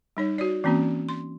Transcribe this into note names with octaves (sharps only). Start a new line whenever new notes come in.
G3 D#4 C#5
F#4 C#5 D5
E3 A#3 C4 C#4 F#4
C6